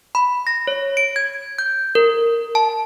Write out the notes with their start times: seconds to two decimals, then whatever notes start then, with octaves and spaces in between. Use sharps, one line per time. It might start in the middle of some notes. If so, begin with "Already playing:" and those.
0.15 B5
0.47 A#6
0.67 C#5
0.97 D7
1.16 G#6
1.59 G6
1.95 A#4
2.55 A5